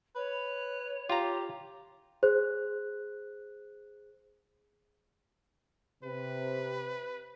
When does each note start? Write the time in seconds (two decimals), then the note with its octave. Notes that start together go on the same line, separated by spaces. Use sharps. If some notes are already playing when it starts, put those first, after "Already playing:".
0.15 B4 C#5
1.10 F4 G4 A#5
2.23 G#4 C5 F#6
6.04 C3 B4